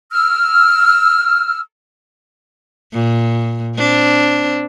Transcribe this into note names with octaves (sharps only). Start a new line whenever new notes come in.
E6 F6
A#2
C4 D4